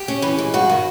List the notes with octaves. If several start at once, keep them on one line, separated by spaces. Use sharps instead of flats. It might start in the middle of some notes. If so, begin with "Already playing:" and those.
Already playing: G4
C#4
E3
G#3
G2 F#4
D#3